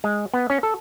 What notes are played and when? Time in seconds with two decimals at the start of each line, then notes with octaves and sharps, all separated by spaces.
0.04 G#3
0.34 B3
0.50 C#4
0.63 A4